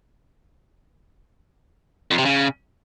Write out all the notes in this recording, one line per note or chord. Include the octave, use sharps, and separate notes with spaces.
F2
C3
C#3